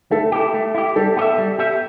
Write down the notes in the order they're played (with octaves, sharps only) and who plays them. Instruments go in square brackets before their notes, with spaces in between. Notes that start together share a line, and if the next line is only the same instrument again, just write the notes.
[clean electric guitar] A3 [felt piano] A4
[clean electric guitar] E4 G4
A3
E4 G4
[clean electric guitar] G3 [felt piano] A4
[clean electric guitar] B3 G4
E5
G3
B3 G4 E5